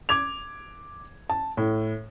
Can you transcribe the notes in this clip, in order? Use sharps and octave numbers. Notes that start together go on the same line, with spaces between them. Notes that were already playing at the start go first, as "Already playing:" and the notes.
D6 G#6 F7
A5
A2